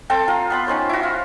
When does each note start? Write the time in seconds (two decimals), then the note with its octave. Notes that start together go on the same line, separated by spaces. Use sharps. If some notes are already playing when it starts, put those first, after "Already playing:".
0.10 C4 A4 G5 A5
0.28 F4 A#5
0.50 B3 B5 C6
0.67 C#4 D#4 C5 C#5
0.89 E4 F#4
1.03 F4